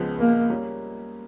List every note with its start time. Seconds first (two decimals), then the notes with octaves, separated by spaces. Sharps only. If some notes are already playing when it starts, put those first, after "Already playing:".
Already playing: C#2 C#3 F3 G#3 B3
0.19 A#3
0.50 G3 A#3 C#4